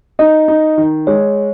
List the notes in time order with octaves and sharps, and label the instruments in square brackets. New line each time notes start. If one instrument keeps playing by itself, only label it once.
[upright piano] D#4 [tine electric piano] D#5
[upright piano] D#4
D#3
[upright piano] G#3 [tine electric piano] C#5